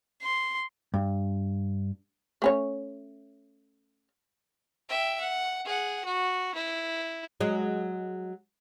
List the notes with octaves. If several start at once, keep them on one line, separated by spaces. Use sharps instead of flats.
C6
G2
A3 C#4 C#5
E5 G5
F#5
G#4 F#5
F#4
E4
F#3 G#3